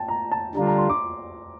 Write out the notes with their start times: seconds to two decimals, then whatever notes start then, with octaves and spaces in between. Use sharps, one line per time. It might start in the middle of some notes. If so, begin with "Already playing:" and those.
Already playing: G5 A5
0.08 A#5
0.32 A5
0.55 D3 G3 D4 F4 A#5
0.67 A#5
0.78 C6
0.89 D6